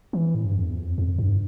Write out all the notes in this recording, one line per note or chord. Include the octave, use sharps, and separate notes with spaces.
E3
A2
G2
F2
E2
F2
F2
G2